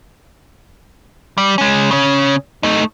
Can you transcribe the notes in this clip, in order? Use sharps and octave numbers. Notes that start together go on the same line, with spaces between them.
G3
G#3 C#4
C#3 C#4
A3 D#4